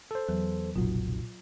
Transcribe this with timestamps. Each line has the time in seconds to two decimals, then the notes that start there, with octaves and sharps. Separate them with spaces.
0.11 A4 C5
0.28 E2 F#3
0.76 F1 B1 A#2 F#3 F4